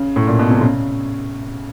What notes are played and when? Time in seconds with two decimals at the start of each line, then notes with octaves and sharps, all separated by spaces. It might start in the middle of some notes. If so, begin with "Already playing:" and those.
Already playing: C#3
0.16 A2
0.27 A#2
0.39 B2
0.50 C3
0.61 C#3